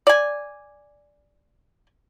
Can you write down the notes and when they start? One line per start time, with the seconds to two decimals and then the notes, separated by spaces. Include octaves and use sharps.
0.07 D5 G#5